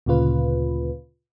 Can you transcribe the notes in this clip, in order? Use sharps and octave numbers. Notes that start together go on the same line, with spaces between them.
D2 A#2 C#3 F4 B4